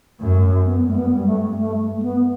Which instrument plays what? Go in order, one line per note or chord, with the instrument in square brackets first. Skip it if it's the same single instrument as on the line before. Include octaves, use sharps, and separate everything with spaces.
[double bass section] F#2 [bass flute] A3
[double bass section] G2 [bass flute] B3
[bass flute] A3
B3
G3
A3
A3
A3
B3